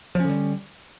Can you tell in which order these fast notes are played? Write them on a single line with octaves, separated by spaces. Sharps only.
F3 C#4 D3 G3